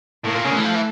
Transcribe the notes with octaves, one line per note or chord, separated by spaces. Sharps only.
A2 A#3
A#2
C#3
D3
E3 A3
F3
E3